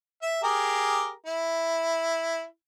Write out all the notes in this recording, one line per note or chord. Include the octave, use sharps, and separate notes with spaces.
E5
G4 G#4 A#4
E4